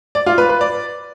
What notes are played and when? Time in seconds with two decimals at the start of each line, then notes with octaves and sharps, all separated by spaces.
0.15 D5
0.26 F4
0.38 B4
0.49 B4
0.61 D5